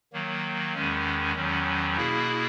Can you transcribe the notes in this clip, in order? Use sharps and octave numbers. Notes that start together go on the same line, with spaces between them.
D#3 F#3 A#3
E2 D#3 G#3 C#4
E2 D#3 F#3 C#4
B2 A#3 E4 G#4